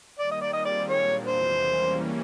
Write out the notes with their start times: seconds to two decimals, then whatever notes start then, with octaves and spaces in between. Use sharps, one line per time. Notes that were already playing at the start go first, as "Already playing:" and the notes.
0.19 D#3 G3 A#3 D5
0.31 D#5
0.42 D5
0.53 D#3 G3 C4 F4 G#4 D#5
0.65 D5
0.90 A#2 F#3 A#3 D4 C#5
1.26 E2 C3 E3 G#3 C5
1.61 E3 G3 A#3 C#4